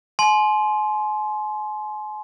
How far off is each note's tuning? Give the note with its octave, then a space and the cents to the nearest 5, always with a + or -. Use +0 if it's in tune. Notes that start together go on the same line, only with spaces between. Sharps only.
G#5 +40 C6 +0